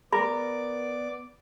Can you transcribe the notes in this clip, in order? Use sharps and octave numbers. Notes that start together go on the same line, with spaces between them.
B3 A#4 D5 B5 D6